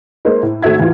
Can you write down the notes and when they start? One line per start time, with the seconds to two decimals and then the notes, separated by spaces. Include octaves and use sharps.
0.25 G#3 A#3 D#4 C5
0.43 A2
0.62 G#1 A3 F#4 E5 G#6
0.80 A1 E2 F4